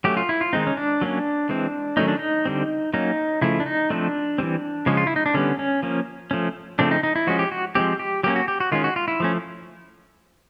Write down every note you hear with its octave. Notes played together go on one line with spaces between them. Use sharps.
F#3 A3 C#4 G4
F4
E4
F4
D#3 G#3 C4 D#4
C#4
D4
F#3 A#3 C#4
E3 G#3 C4
D#3 F#3 A3 C#4 D#4
D4
D#4
D3 G3 C4
F#3 A#3 C#4 D#4
C#3 F3 A3 E4
D4
D#4
F3 A3 C4 D4
E3 G3 C4
C#3 F3 G#3 C#4
F4
E4
D#4
D4
D3 G3 B3 C#4
C#4
F3 A#3 C#4
F3 A3 C#4
C#3 F3 A3 C4 D4
D#4
D#4
E4
F3 G#3 C#4 F#4
G4
F#4
F3 G#3 C4 G4
G4
F#3 A#3 C#4 G4
F#4
G4
F#4
D#3 G#3 C#4 F4
F#4
F4
E4
F3 A3 C#4